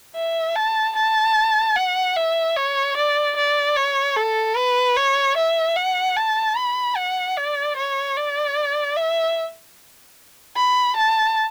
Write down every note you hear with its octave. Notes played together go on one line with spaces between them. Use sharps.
E5
A5
A5
F#5
E5
C#5
D5
D5
C#5
A4
B4
C#5
E5
F#5
A5
B5
F#5
D5
C#5
D5
E5
B5
A5